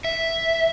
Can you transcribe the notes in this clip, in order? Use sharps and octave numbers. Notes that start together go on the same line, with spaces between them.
E5